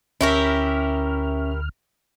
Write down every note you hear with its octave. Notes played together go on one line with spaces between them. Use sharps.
D2 C#4 E4 G4 A#4 E5 C#6 F6